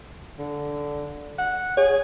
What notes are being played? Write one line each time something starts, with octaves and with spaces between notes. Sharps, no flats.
D3
F#5
G#4 C#5